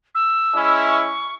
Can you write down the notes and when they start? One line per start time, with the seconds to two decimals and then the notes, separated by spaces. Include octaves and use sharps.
0.15 E6
0.54 G#3 C#4 E4
0.86 C#6